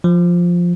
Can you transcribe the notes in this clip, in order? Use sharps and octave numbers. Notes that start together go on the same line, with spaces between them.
F3